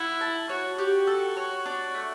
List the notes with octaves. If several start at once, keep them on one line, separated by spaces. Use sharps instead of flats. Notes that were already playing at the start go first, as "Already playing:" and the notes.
Already playing: E4 F#5
A5
F#4 C#5
F#4 G4
A4
C#5
D4
A3